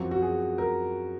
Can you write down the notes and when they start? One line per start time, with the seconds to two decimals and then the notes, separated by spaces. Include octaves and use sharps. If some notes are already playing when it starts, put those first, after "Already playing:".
Already playing: F#2 F3 C4 F#4
0.11 F#4
0.22 G#4
0.58 A#4